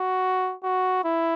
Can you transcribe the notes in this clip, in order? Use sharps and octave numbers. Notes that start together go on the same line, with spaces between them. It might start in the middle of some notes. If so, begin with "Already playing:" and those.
Already playing: F#4
F#4
E4